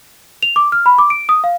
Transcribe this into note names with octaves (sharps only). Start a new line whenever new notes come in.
F7
D6
F6
B5
D6
D7
D#6
F5